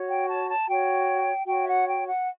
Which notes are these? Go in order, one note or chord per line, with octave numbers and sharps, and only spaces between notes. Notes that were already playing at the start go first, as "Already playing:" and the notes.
Already playing: F#4 C#5
G5
A5
A5
F#4 C#5 G5
F#4 C#5 G5
E5
F#5
G5
F#5